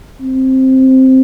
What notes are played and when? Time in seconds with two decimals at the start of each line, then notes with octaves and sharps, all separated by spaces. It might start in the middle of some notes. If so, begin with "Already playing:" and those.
0.21 C4